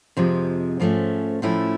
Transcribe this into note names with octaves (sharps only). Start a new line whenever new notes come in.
F2 C3 F3 G#3
G#2 F3 A3 C#4
A2 F3 A3 C#4 E4